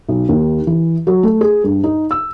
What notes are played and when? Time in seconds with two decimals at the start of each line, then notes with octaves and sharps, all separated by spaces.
0.09 B1
0.29 D#2
0.67 E3
1.07 F#3
1.23 A3
1.41 G#4
1.64 G2
1.84 D#4
2.11 E6